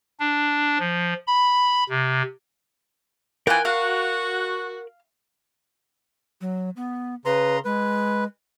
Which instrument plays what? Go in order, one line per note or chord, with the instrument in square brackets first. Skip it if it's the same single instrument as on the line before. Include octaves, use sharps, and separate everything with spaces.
[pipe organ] D4
F3
B5
C3
[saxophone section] E3 B3 F4 [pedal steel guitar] A#4 F#6 [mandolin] G5 G#5
[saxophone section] F#4 [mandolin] F5
[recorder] F#3
B3
[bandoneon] C#3 A#5 C6 [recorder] B4
[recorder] G#3 [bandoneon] B4